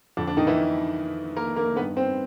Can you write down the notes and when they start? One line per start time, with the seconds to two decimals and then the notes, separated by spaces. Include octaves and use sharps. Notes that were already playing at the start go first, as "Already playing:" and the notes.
0.17 F2 D3 D4
0.27 D4
0.37 D#3 D#4
0.47 E3 E4
1.36 A#3 A#4
1.56 A#3 A#4
1.76 D#3 B3 B4
1.81 G2
1.97 C4 C5